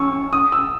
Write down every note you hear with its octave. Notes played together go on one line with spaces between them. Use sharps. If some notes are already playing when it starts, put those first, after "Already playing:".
Already playing: C#4 C#6 E6
D#6
E6